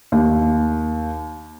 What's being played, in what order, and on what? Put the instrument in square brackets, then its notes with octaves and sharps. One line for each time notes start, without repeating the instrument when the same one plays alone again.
[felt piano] D#2